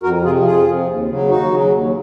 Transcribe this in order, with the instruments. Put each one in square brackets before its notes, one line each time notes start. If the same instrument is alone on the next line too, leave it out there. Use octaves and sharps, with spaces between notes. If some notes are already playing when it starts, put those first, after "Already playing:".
[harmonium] F2 F#4 A#4
C3 F3 F4 G#4
F2 F4 G#4
C3 F3
D#2
C#3 F#3
D#2 D#4 F#4
C#3 F#3
D#2